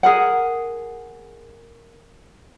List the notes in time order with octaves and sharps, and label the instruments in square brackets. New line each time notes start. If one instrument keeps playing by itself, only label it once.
[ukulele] G#4 A#4 F#5